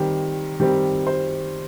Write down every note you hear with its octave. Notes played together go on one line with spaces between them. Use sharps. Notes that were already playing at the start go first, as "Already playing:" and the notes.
Already playing: D#3 G3 C4 G4
D#3 G3 C4 G4
C5